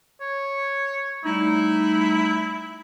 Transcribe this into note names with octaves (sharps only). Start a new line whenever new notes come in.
C#5
G3 A3 D#4 E4